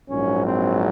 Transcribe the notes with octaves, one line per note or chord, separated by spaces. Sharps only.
A#1 G#2 F#3 C#4
C4